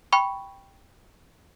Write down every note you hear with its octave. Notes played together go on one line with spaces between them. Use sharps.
G5 B5 C#6